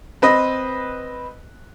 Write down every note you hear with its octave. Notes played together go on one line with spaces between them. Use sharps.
C4 B4 D#5